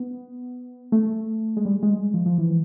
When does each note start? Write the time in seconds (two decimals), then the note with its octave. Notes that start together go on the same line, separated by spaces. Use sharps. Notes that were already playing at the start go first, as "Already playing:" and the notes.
Already playing: B3
0.92 A3
1.57 G#3
1.65 G3
1.83 G#3
2.14 F3
2.26 F3
2.38 E3